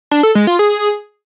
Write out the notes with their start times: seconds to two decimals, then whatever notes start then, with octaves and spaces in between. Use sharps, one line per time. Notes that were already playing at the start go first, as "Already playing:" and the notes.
0.11 D4
0.23 A4
0.35 G#3
0.47 F4
0.59 G#4